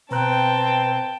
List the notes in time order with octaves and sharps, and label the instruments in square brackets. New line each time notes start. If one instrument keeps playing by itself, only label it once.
[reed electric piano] B2 A#5 F#6 [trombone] C4 [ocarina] B4 [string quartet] G5 A5